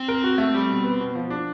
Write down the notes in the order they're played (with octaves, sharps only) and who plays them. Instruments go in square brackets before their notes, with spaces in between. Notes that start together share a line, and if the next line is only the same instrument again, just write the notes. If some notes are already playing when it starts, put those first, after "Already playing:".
Already playing: [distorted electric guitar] C4
[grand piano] A#4
F#4
A3
G3
B2
B3
B2
F3
D4